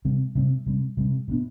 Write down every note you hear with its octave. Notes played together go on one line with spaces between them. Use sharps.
C3 G3 C4
C3 G3 C4
C3 G3 C4
C3 G3 C4
B2 G3 B3 D4